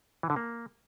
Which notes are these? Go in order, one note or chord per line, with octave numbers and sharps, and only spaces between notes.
E3
D3
A#3